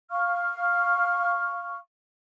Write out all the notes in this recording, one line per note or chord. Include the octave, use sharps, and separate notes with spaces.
F5 C#6 F6